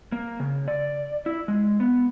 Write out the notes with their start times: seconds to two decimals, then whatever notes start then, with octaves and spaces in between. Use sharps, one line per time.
0.12 A#3
0.40 C#3
0.68 D5
1.26 E4
1.48 G#3
1.80 B3